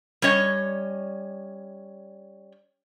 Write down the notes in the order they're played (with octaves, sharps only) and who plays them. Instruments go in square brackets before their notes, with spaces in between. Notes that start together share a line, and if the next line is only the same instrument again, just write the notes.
[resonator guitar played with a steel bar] G3 C#4 C#5 D#5